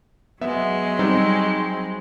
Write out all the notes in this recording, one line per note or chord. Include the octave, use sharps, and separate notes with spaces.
F#3 G#3 B3 E5
G3 C4 D#4